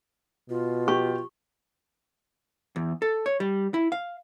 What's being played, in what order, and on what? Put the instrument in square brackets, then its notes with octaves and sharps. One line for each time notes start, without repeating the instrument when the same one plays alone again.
[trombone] B2 [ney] F4
[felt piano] G4 [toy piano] C#6
[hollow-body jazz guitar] E2
A4
C#5
G3
E4
F5